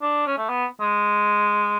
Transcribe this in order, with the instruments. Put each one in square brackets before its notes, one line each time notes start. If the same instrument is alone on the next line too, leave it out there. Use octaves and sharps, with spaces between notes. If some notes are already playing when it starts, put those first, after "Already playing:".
[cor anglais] D4
C#4
A3
B3
G#3